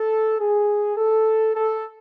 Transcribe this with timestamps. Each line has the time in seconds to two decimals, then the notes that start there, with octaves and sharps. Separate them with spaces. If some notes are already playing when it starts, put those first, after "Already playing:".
Already playing: A4
0.39 G#4
0.96 A4
1.55 A4